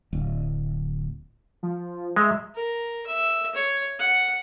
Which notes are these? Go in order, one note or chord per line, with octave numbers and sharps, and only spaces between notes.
D1
F3
G#3 E5
A#4
E5
C#5
F#5